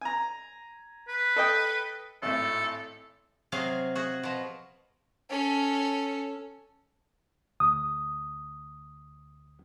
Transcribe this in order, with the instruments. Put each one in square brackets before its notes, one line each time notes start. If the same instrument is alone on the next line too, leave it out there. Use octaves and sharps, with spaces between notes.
[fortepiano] G#5 A#5
[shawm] B4
[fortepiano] A4 D#5 G5
[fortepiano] G#1 A2 [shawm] A4
[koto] C3 F#3 G#4 F5
F#4 G#4
B2 F3
[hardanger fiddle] C#4 A4
[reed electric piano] D2 D#6